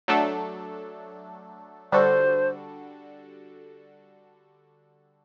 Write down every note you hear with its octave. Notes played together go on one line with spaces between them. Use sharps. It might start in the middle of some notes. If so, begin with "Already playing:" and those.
F#3 A3 D4 A4
D3 G3 D4 F#4 A4 C5